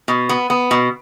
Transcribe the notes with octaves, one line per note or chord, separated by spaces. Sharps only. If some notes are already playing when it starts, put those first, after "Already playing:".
B2
B3
B3
B2